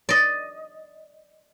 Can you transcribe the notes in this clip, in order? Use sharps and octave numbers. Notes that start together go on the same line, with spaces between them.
D5 D#5